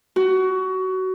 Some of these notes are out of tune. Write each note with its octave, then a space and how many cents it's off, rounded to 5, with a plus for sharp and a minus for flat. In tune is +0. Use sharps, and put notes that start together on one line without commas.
F#4 +20